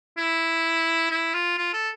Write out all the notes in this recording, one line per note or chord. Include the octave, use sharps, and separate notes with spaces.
E4
E4
F4
F4
A4